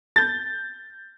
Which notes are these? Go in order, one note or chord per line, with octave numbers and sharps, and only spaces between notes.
G6 A6